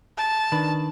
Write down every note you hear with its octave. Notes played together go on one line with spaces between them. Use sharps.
A5
D#3 D4 B4